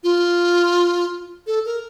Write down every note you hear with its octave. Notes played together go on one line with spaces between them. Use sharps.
F4
A4
A#4